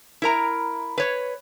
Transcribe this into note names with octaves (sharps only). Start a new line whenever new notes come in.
E4 A#4 A#5
B4 C#5